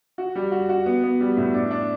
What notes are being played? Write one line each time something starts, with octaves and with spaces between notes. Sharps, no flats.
F#4
G3
F#4
F#4
B3
B3
G3
A2
D4
D4